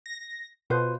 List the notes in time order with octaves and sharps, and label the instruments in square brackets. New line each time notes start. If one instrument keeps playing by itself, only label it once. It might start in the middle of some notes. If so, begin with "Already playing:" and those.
[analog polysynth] A#6
[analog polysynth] B2 [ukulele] F4 B4 C5